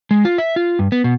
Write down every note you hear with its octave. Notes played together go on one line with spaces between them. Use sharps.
G#3
F4
E5
F4
G2
B3
B2